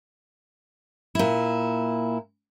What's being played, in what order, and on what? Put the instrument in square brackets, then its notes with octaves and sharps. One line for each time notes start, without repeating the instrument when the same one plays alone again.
[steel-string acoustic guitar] A#2 E4